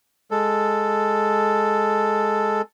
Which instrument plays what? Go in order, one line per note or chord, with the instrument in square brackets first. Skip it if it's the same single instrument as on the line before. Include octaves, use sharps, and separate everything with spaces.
[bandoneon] G#3 A4